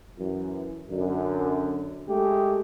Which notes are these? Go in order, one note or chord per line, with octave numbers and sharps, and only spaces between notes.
F#2 E3
F#2 D3
G#3 A3 G4